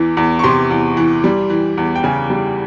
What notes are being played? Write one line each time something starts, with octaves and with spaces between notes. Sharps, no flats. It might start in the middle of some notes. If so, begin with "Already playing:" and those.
Already playing: E2 E3
E2
C#6
C3 C6
E2
E3
G3
E3
E2
G5
C#3 G#5
G3